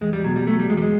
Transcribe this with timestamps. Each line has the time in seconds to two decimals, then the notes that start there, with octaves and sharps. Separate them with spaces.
0.01 E2 G#3
0.13 G3
0.24 B2 F#3
0.36 G3
0.47 F#3 A3
0.59 G3
0.70 E2 G#3
0.77 G3
0.82 G#3